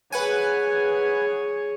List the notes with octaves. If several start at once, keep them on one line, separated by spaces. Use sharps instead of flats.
G#4 B4 C#5 F#5 G#5